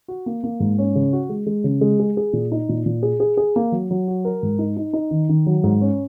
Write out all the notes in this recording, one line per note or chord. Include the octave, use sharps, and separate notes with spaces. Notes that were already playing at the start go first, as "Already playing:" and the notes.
F#4
A#3
A#3
G#2
C#4
C#3
F#4
G#3
G#3
C#3
G#3
G#4
G#4
A#2
D#4
A#2
A#2
G#4
G#4
G#4
A#3
F#3
F#3
F#4
A#4
G#2
D#4
D#4
D#4
D#3
D#3
F#3
G#2
C#4